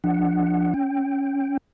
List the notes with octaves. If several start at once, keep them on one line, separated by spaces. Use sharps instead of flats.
F3 D4 F#5
C#4 G5